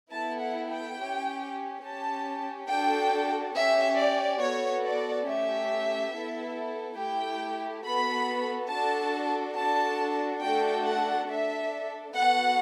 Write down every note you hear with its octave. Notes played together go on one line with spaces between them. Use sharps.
B3 E4 A4 A5
F#5
G5
C#4 G4
C#4 G4 A5
D4 F#4 A4 G5
C#4 G4 E5
D5
B3 F#4 A4 C#5
D5
A3 C#4 G4 E5
B3 E4 A4
A3 E4 G4 G5
B3 F#4 A4 B5
D4 F#4 A4 A5
D4 F#4 A4 A5
A3 D4 F#4 A4 G5
F#5
D4 A4 E5
B3 F#4 A4 F#5